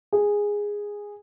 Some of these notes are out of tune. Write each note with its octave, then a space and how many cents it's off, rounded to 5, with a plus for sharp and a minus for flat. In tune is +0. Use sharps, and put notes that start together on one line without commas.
G#4 -10